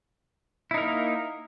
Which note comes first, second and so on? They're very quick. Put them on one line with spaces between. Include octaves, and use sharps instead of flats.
E4 D#4 A#4 A#3